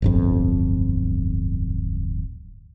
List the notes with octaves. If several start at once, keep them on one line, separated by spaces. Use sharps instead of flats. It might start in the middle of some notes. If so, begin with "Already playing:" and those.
D1 G1 F2